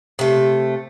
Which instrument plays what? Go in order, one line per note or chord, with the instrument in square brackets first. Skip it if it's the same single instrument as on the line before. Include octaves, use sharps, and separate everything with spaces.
[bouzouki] C3 A3